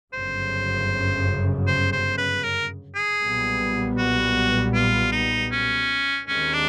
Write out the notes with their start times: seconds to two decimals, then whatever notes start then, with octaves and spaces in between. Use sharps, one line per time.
0.13 G1 F#2 C#3 C5
1.67 C5
1.92 C5
2.18 B4
2.43 A#4
2.95 G#4
3.20 B1 A#2 G3 B3
3.98 F#4
4.74 F4
5.12 D#4
5.52 C#4
6.28 D#2 D#3 G#3 C4 C#4
6.54 D4